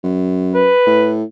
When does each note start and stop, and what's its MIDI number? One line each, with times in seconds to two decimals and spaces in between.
0.04 0.71 42
0.55 1.14 71
0.86 1.23 45